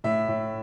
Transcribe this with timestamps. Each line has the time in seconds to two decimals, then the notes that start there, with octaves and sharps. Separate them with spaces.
0.04 A2 E5
0.28 A2